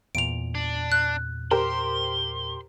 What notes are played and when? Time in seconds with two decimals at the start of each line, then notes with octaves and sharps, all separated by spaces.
0.15 E2 A#2 D7 F7
0.55 D4
0.92 F#6
1.51 G4 A#4 C5 C6